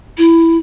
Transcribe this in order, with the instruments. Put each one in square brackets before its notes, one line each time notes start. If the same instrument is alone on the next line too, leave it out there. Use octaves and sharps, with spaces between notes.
[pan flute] E4